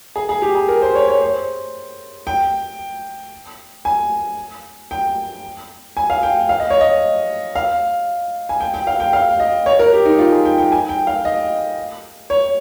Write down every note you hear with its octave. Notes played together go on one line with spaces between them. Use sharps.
G#4
G#4
G4
G#4
A#4
C5
C#5
C#5
C5
G5
G#5
G5
G#5
F5
G5
F5
D#5
C#5
D#5
F5
G#5
G5
G5
F5
G5
F5
D#5
C#5
A#4
G4
D#4
F4
G#4
G5
G5
G#5
G5
F5
D#5
C#5